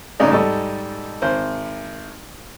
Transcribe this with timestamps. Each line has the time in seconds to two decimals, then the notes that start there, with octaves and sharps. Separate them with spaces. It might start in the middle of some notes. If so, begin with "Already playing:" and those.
0.20 A1 G#2 C#3 D#4 D5
0.31 G#2 G3 A4 D#5 C#6
1.22 G#1 C5